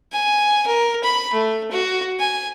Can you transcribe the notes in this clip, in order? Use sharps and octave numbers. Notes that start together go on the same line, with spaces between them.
G#5
A#4
B5
A3
F#4
G#5